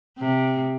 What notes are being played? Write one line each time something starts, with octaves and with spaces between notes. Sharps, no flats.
C3